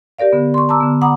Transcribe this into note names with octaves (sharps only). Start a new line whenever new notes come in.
G4 A#4 D5 F5
D3 B3
C6 C#6
A5 A#5 D6 E6
D3 B3
F#5 A#5 B5 D6 D#6